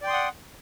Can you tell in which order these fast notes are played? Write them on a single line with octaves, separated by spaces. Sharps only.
D5 G5 C6 D#6 F#5